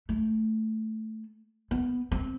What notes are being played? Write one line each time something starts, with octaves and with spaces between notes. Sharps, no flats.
A3
B3
C4